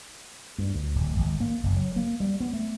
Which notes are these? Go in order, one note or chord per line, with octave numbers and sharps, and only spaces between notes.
G2
D2
D1
G#1
A#3
F#1
F#3
A#3
G3
B3
A3